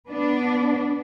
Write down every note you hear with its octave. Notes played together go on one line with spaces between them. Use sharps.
B3 D4